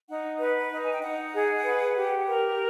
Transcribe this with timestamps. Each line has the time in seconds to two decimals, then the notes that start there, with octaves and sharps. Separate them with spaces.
0.08 D#4 F#5
0.39 B4
0.71 D#4
0.83 G#5
0.92 G5
1.02 D#4 F#5
1.33 G#4
1.64 B4
1.95 G4
2.26 A#4